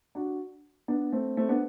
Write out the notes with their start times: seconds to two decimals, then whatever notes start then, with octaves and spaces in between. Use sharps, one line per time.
0.15 D4 F#4
0.88 B3 D4
1.12 A3 C4
1.37 A3 C4
1.49 B3 D4